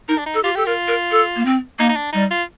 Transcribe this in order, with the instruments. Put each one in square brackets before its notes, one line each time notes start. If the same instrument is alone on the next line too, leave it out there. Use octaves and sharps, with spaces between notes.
[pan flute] D#4 [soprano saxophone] A#4
[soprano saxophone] D4
D#4
[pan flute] A4
[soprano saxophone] F4 [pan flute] G4
[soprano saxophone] G4 [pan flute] A4
[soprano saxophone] F4 [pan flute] A#4
[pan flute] A#4
A4
A#3
C4
[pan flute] A#3 [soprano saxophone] D#4
[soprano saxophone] D#4
D4
[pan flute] G3 [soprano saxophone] D#4
[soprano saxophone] F4